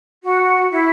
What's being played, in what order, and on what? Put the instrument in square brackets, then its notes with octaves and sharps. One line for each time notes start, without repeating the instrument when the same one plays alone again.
[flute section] F#4
E4